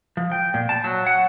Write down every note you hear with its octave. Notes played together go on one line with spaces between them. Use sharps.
F3
G5
A#2
A5
F#3
F#5